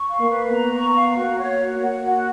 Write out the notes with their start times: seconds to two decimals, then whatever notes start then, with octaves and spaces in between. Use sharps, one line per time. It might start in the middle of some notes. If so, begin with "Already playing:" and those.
Already playing: C#6
0.09 F5
0.20 A#3
0.30 B4
0.51 B3 A#5
0.73 C#6
0.95 F5
1.17 A#3 F#4
1.37 C#5
1.60 F#4
1.80 A#3 F#5
2.03 F#4